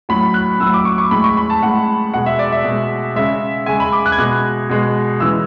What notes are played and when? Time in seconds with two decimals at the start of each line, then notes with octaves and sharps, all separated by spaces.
0.09 A2 F#3 B5
0.34 F#6
0.60 A2 F#3 E6
0.74 D6
0.85 C#6
0.98 C#6
1.11 A2 G#3 B5
1.24 C#6
1.37 B5
1.50 A5
1.63 A2 G#3 F#5
2.14 B2 G#3 F#5
2.26 E5
2.39 D5
2.52 E5
2.64 B2
2.69 G#3
3.16 C#3 G#3 E5
3.66 C#3 G#3 G#5
3.80 B5
3.92 D6
4.06 F#6
4.12 G#6
4.18 B2 G#3 F#6
4.69 B2 G#3
5.20 C#3 E3 G#3 E6